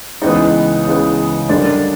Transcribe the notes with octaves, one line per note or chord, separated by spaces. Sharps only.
C#2 C#3 E3 G#3 B3 D#4 D#5
C#2 C#3 E3 G#3 B3
F#2 D3 G3 A#3 D4 D5